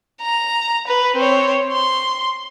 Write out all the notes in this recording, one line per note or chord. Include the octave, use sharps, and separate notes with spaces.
A#5
B4
C4 C#5
C6